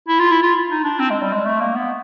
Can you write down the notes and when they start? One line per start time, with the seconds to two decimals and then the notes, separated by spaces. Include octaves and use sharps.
0.09 E4
0.20 F4
0.31 E4
0.42 F4
0.69 D#4
0.84 D4
0.99 C4
1.10 G#3
1.22 G3
1.33 G#3
1.45 A3
1.60 A#3
1.75 B3